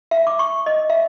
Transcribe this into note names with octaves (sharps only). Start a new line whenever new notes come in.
E5
D6
C#6
D#5
E5